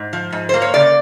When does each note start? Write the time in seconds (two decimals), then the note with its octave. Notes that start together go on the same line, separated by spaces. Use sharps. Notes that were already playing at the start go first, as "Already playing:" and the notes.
Already playing: G#2
0.13 F3
0.32 G#2
0.49 A#3 C5
0.62 C#5
0.74 C#3 D5